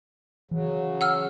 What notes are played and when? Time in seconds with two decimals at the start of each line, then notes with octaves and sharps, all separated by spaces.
0.51 C#3 E3 F#3
1.01 F#5 E6 F6